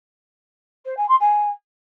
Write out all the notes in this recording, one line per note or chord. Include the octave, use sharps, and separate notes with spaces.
C5
G#5
C6
G#5